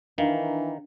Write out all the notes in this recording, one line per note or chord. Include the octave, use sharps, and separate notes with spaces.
D#3 E3 D4 A#4 F5